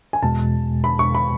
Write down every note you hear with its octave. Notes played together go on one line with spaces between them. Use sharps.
G#5
E2 B2 G#3 A5
B5
C#6
B5